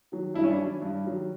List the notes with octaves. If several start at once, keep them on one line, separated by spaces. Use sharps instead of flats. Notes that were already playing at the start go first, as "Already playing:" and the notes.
D#3 F#3
G2 E4
C#4
D4
D#3 F#3
G2
D#3 F#3